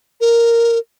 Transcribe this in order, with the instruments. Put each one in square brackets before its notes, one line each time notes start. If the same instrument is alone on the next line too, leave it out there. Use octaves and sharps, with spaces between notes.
[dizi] A#4